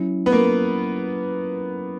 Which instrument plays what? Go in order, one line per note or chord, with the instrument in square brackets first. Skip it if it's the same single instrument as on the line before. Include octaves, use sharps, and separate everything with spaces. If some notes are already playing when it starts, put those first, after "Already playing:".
Already playing: [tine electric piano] F#3 C#4 E4
[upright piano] B3
A#3